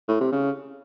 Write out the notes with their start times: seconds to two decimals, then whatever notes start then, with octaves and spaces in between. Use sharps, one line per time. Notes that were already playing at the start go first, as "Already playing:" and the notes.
0.08 A2
0.20 C3
0.32 C#3